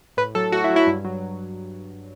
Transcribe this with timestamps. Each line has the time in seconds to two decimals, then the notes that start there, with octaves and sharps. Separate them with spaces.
0.17 A2 B4
0.35 F#3 A4
0.52 A2 F#4
0.64 E4
0.70 F#3
0.76 E4
0.87 G2
1.05 F#3